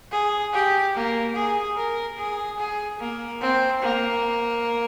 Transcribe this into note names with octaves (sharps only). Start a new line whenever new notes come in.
G#4
G4
A#3
G#4
A#4
G#4
G#4
A#3
C4
A#3